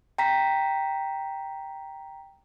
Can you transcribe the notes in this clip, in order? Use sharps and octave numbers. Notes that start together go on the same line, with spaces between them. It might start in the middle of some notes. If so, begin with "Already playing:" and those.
G5 A#5 B6